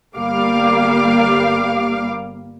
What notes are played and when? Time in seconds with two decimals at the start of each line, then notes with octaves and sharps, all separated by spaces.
0.17 G1 G3 A#3 F5 D6